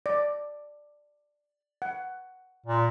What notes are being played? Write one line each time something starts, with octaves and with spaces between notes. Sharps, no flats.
D5
F#5
A#2